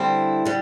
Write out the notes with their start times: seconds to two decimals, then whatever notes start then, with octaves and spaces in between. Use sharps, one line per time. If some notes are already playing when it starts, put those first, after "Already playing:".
Already playing: D3 G3 C4 E4
0.45 D3 G3